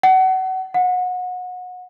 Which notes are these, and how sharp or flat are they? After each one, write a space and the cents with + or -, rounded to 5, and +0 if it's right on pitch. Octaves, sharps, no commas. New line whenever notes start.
F#5 +30
F#5 -30